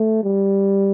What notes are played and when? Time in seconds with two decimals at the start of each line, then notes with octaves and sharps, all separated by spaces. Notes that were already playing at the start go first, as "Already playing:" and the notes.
Already playing: A3
0.23 G3